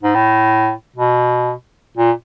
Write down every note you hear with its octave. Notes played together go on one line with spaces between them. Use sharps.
G#2
A2
B2
A#2